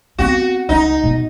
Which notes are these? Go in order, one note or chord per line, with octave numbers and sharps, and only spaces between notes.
B3 C4 F#4
C#2 D#4
B2